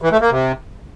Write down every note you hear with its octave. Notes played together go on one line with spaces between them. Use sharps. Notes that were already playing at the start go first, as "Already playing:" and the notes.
E3
A3
A#3
C3